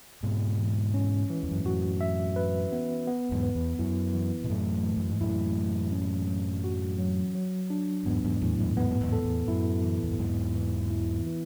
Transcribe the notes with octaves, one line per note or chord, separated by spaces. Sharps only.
G#2 B2 G#3
E3
C#4
E3
E2
F#2
G#2
F#2 A2 F#4
E5
B4
B3
B3
E2 G#2
B4
E2
F#2 E4
E3
B2
F#2 A2 A3
E3
F#2
G#2
F#2 A2 E4
E3
C#4
F#3
F#4
F#3
F#3
D4
E2 G#2 B3
E2 G#2
E2 A2
E2 G#2
E2 G#2 B3
F#2
E2 G#2
A4
E2
F#2 E4
E3
E2
F#2
E2 G#2 B3
E3
E4
E3